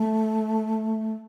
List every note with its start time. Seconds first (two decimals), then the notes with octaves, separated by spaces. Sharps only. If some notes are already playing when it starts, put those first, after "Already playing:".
Already playing: A3